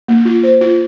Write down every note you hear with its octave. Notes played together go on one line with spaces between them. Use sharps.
A#3
F4
C5
F4